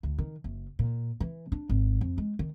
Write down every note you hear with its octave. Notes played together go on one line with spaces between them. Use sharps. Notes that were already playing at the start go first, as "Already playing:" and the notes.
D2
D#3
F#1
A#2
E3
D4
G#1
F2
G#3
D#3